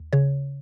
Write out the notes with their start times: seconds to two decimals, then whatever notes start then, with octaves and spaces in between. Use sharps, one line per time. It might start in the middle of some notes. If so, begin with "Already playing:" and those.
Already playing: D#2
0.13 C#3 C#5